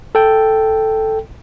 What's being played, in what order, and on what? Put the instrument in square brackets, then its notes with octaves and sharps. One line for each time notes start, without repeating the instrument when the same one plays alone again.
[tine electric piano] A4 G5